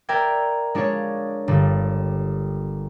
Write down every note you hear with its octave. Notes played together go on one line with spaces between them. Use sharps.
A#4 D5 E5 G5 G#6
G#3 D4 F4 C#5
G1 G3